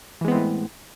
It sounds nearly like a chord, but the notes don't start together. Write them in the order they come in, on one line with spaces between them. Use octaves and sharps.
E3 G#3 B3 C4 A2